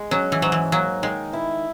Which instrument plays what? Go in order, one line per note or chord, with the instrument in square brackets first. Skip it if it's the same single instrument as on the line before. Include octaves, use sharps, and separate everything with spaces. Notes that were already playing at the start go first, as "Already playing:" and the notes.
Already playing: [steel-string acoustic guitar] G#3
[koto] F#3 [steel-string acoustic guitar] C#4
[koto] E3
[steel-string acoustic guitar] G#2 [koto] F#3
[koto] E3
[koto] F#3 [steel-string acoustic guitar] A#3
[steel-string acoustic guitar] D#3 [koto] G#3
[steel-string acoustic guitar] E4